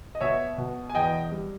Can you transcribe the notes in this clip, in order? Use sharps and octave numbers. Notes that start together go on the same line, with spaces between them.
D#5
B2 C#5 E5
B2
G#5
E2 D#5 G5
G3